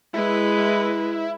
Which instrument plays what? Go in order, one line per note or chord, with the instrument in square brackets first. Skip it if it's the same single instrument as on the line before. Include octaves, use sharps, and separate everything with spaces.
[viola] G#3 B4 [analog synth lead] E4